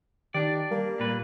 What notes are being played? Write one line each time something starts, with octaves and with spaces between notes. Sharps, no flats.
D#3 D4 G4 D5
G3 A#3
A#2 B4